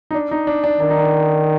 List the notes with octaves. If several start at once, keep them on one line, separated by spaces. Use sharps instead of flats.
D#4
D4
D#4
D4
D4
D#3 D4
D#4
D4